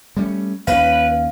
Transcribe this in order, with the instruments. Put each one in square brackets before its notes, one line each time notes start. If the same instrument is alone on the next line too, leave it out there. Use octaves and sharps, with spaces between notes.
[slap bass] G3 A3 C#4
[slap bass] D#2 C#4 [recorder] B4 [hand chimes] F5